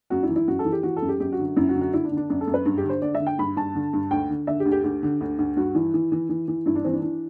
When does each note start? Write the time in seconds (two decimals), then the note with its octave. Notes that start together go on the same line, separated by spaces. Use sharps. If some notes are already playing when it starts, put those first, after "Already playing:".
0.10 F#2 F#4
0.23 E4
0.29 E3
0.36 E4
0.48 F#2 F#4
0.59 A4
0.65 E3
0.72 G4
0.83 E3 F#4
0.97 A4
1.02 F#2
1.08 G4
1.20 F#2 G4
1.32 F#4
1.39 D3
1.45 F#4
1.56 F#2 E4
1.69 F#4
1.75 D3
1.81 F#4
1.93 D3 E4
2.05 D4
2.12 D3
2.17 D4
2.30 F#2 D4
2.41 A4
2.47 F#2
2.54 B4
2.66 G2
2.78 G4
2.84 D3
2.90 C5
3.02 D3 D5
3.15 E5
3.20 D3
3.27 G5
3.39 G2 B5
3.56 G2 A5
3.75 D3
3.93 G2
4.11 D2 G5
4.30 D3
4.47 D3 E5
4.60 G4
4.65 D2
4.72 G4
4.84 D2 G4
5.03 D3
5.21 D2
5.39 D2
5.56 G2 F#4
5.75 E3 E4
5.94 E3
6.12 E3
6.29 E3
6.48 E3
6.66 G2 E4
6.75 D4
6.84 E3 C4
6.93 D4
7.02 E3